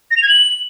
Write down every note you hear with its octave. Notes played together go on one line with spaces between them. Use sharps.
A#6
F7
G#6
F#7